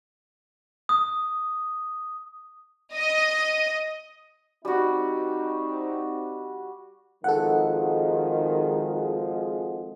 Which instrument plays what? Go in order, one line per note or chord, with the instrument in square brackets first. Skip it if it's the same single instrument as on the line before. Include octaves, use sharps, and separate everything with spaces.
[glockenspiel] D#6
[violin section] D#5
[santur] G3 F#4 [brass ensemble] C4 D#4
[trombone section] G#1 F3 G#3 [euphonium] D#3 [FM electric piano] A4 F#5